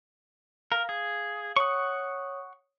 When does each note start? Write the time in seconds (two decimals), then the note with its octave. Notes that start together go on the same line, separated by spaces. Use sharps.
0.72 A#4 F5
0.89 G#4
1.56 C#5 F#5 C#6 D#6